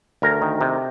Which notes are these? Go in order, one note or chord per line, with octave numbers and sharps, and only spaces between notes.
D2 A#4
D#3
C3